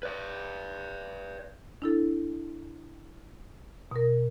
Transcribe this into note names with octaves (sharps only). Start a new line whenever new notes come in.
B4 D5
D4 E4 A4
B2 A#4